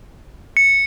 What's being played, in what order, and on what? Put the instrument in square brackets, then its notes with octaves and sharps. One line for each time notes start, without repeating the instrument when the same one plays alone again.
[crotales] C#7